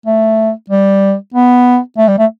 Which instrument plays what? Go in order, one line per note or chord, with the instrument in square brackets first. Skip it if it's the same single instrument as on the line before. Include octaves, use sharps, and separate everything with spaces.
[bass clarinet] A3
G3
B3
A3
G3
A3